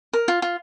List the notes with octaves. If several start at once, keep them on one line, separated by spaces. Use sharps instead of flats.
A#4
F4
F4